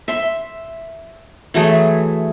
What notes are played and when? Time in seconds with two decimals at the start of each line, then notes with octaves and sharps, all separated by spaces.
0.08 E5 C6
1.54 E3 F#3 A3 G#4